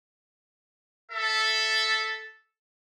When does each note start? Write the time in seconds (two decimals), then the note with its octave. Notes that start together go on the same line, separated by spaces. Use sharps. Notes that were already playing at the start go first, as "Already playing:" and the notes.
1.12 A4 E5